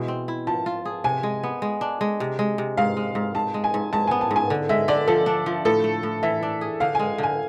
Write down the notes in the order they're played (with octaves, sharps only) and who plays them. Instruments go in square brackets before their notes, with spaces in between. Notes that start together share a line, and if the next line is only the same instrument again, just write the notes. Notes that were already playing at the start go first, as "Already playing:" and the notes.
Already playing: [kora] B2 E3 G#3 E4
C4
E4
[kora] F3 [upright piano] A5
[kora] F4
G#4
[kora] C3 [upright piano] G#5
[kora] G#3
B3
G#3
D4
G#3
C3
G#3
C3
[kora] G#2 [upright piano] F5
[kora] G#3
G#2
[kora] G#2 [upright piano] A5
[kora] G#3
[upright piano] G#5
[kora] G#2
[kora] G#2 [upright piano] A5
[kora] B3 [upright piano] G#5
[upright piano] A5
[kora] G#2
[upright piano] G#5
[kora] D3
[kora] G#3 [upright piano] E5
[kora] D3 [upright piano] D5
[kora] F3 [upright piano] A4
[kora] D4
F3
[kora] A2 [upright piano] A4
[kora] A3
A2
[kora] E3 [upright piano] E5
[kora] D4
G#4
[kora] D3 [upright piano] F5
[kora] G#3 [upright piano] G#5
[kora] D3 [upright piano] G#5